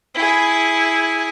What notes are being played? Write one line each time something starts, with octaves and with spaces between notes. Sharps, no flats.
E4 G#4